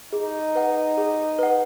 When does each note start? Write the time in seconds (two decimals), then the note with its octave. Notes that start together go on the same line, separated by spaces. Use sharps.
0.13 D#4 G#4
0.55 B4 F#5
0.97 G#4
1.39 B4 F#5